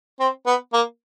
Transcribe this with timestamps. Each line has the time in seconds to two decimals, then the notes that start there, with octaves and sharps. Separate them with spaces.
0.20 C4
0.46 B3
0.73 A#3